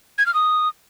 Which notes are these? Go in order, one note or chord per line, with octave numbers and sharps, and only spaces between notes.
G#6
F6
D#6